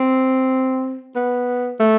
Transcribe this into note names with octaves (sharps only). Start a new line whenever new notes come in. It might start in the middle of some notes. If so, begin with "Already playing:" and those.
Already playing: C4
B3
A3